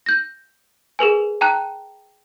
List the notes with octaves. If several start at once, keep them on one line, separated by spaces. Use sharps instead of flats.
G6 A#6
G#4 A#4 B4 G#5
G5 A5 A#5 F#6